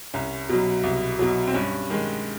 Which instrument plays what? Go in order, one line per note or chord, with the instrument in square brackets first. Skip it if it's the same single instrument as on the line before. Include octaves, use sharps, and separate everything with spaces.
[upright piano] C2 C#4
B2 F#3
C2
B2 F#3
C4
G2 C#4
D#3 G#3